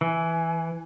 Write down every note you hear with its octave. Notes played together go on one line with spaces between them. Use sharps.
E3 G#5